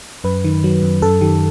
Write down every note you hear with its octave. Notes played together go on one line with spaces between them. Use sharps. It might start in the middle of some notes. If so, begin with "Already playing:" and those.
F#2 B4
D#3
F#3
F#2
F#2 A4
D#3 G4